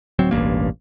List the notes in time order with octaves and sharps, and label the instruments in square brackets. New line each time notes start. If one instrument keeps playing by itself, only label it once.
[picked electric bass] D1 F#3 C4
E1 A1 G2 A#3